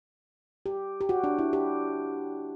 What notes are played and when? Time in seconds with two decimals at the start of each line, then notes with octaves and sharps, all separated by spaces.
0.66 G4
1.01 G4
1.09 F#4
1.24 D4
1.39 E4
1.53 G4